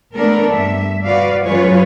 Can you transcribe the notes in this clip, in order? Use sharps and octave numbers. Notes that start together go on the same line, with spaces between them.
A3 B3 D4 A4 A#4
G2 E5
F#4 B4 D5 F5
F#2 F#3 F4 G#4 B4 C#5